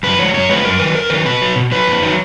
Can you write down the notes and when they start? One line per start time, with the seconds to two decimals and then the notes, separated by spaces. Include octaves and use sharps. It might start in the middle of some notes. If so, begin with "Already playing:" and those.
0.03 F#2 B4
0.19 F3 G#3 C#5
0.34 F#2 C#5
0.49 F3 G#3 B4
0.65 F#2 A#4
0.79 D#3 F#3 B4
0.95 F#2 A#4
1.10 D#3 F#3 B4
1.25 B2 B4
1.42 F#3
1.56 B2
1.72 F#3 B4
1.87 F2
2.03 D#3 F#3